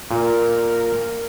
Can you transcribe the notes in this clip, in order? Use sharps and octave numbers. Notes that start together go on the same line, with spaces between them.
A#2 A#4